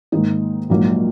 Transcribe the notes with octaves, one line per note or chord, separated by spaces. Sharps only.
G#2 D#3 A#3 D#4
A#1 G#2 F#3 A#3